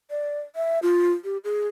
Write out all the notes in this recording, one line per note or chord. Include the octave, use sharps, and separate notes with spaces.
D5
E5
F4
G4
G#4